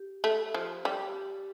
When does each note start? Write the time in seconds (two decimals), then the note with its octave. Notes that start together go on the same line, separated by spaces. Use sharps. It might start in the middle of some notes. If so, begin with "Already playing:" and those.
Already playing: G4
0.24 A3
0.54 F3
0.85 G3 G4